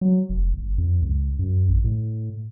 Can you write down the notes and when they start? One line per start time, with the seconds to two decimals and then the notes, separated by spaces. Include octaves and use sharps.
0.01 F#3
0.29 F1
0.54 G1
0.78 F2
1.02 C#2
1.39 F#2
1.69 A#1
1.84 A2